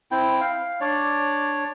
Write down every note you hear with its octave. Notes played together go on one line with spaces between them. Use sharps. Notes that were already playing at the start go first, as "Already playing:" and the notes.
C4 E4 G5
F5
D4 C#5 D5